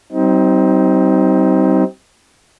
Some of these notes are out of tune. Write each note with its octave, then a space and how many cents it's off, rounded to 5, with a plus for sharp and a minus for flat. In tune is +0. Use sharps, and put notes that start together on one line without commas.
G3 -40 C4 +0 D#4 +25